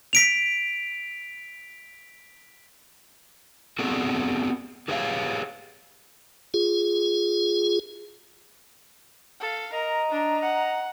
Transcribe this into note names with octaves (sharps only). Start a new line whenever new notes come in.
B6 D7 F7
B3 C4 D4 F#4 G#4 A4
G4 G#4 B4 C#5 D#5 F5
F4 G#4
A4 F5
A#4 D#5 A#5
D4
F#5